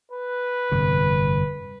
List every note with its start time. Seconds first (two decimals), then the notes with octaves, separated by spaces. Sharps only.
0.12 B4
0.72 G1 F2 C3